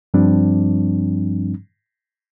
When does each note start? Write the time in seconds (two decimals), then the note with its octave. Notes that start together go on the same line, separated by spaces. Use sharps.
0.14 G2 F3 G3 C4 D4